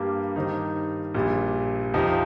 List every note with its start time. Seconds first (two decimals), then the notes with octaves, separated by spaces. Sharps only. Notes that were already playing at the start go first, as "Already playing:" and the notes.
Already playing: G2 G3 A#3 G4
0.36 G2 D#3 G3 D#4 C5
1.14 A#1 A#2 G3
1.94 F2 C3 F3 D#4